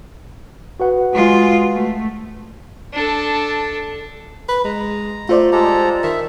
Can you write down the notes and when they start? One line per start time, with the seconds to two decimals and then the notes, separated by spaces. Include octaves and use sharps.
0.80 F#4 B4 F#5
1.13 G#3 F4
1.73 A3
2.94 D4 A4
4.49 B4
4.65 G#3 A#5
5.29 A3 F4 C5 D5
5.52 G#3 G4 A4 A#5
6.03 D#3 E5